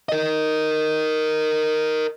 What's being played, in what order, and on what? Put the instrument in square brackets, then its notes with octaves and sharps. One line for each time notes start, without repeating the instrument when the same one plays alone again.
[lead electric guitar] A#4 D#5